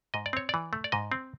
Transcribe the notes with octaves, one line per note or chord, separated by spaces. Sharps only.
G#2 D#5
D5
C4 C#5
E3 D5
A3
D5
G#2 D#5
C4